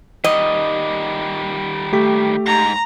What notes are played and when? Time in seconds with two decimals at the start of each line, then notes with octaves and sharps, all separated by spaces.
0.24 D#3 G3 D#5
1.92 A3 G4 B6
2.47 G#2 A#5